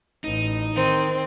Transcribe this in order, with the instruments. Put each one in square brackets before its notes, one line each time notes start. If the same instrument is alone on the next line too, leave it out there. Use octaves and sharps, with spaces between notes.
[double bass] A1 [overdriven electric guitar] D#4
[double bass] D#3 [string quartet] C4